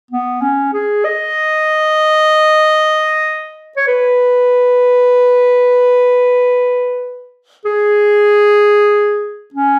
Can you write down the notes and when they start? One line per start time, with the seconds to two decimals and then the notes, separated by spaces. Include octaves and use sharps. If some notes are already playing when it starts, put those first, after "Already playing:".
0.11 B3
0.41 C#4
0.73 G#4
1.05 D#5
3.77 C#5
3.88 B4
7.65 G#4
9.54 C#4